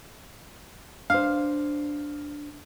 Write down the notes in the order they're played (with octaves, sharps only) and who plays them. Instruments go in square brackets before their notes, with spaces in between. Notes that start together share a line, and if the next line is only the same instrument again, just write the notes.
[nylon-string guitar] D4 C5 [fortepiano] F5